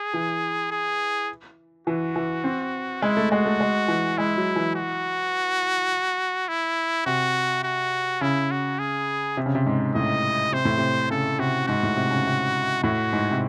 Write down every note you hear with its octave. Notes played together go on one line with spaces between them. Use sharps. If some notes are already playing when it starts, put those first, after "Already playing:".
Already playing: G#4
E3
G#4
E3 F#4
E3
C4
G#3 E4
A3
G#3 F#4
A3
G#3
E3
G#3 E4
F#3
E3
F#4
E4
C3 F#4
F#4
C#3 E4
F#4
G#4
C3
C#3
C3
G#2
A2 D#5
C3 C5
A2
C3
C#3 A4
C3 F#4
G#2 F#4
A2
C3
C#3
C3
A2 F#4
G#2
C3